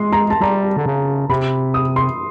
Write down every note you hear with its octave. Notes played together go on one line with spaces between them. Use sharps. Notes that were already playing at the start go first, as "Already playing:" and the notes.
Already playing: G#3 C6
A#5
A5
G3 A#5
D3
C#3
C3 B5
D#6
C6